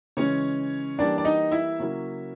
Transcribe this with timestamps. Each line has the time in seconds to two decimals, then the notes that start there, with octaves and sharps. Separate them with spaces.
0.17 C#3 E3 G#3 C#4 C#5
0.98 E3 G3 A#3 D4 D5
1.18 D5
1.25 D#4 D#5
1.52 E4 E5
1.79 C#3 F#3 A#3 C#4 E4